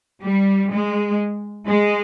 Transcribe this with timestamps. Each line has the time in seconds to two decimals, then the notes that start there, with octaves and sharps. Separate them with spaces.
0.23 G3
0.71 G#3
1.68 G#3